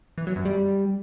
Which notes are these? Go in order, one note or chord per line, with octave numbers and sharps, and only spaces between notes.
E3
F#3
F#2
G3